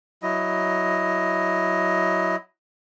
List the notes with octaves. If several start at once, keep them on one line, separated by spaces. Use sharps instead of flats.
F#3 E4 D#5